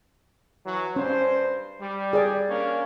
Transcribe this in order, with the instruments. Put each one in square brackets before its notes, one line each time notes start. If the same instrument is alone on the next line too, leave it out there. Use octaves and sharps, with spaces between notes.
[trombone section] E3 F#3
[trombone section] G2 C5 [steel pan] C#4
[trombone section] G3
[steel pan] G#4 D5
[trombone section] A#3 C#4 D4